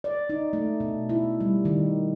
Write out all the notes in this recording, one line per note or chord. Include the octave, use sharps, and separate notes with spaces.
D5
D#4
A3
B2
E4
G3
D#3